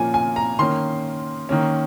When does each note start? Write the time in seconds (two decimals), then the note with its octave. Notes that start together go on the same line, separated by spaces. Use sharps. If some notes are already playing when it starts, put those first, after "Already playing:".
Already playing: A#2 F3 A#3 C#4 G#5
0.14 G#5
0.36 A#5
0.59 D#3 A#3 C#4 C6
1.49 D#3 A#3 C#4